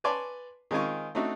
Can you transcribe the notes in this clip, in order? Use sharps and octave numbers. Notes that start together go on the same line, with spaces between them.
B4 C#5 D5 G#5 A5 C6
D#3 G#3 C4 F4 G#5 C#6
A3 C4 D4 D#4 F#4